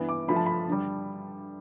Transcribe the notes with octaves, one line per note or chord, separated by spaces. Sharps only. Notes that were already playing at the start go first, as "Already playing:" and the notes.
Already playing: G2 E3 B3
D6
G2 F3 A3 B5
A5
B5
G2 D3 G3